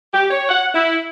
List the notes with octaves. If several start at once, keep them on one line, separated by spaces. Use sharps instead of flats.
G4
C#5
F#5
E4